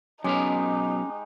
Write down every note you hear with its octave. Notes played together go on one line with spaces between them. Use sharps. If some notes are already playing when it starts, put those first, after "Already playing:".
F#3 G#3 B3 C#4 D#4 G4 F5